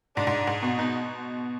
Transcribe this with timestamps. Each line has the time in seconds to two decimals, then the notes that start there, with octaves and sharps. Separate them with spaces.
0.16 G#2 D4
0.27 G#2
0.47 G#2
0.62 B2
0.78 B2 D#4